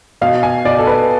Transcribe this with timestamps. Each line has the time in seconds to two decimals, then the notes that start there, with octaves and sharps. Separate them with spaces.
0.22 B2 F5
0.43 G#5
0.65 B2 D5
0.79 A4
0.87 B4